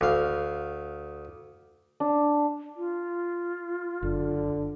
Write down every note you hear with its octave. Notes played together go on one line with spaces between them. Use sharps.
D2 F5
D4
F4
F#1 D3